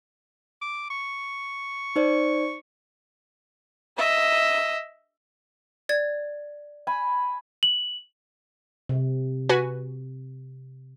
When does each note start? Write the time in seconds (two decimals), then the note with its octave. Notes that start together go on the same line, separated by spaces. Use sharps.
0.61 D6
0.90 C#6
1.96 D#4 C5 D5
3.98 D#5 E5
5.89 D5 G#6
6.87 G#5 B5
7.63 F#7
8.89 C3
9.49 F#4 B4 G#5